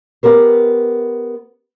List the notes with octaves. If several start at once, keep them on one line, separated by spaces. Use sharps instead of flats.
B3 G4 A#4 C5